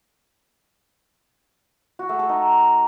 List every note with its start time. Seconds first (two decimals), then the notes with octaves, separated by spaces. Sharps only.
1.99 F#4
2.09 A3
2.19 A4
2.29 D#4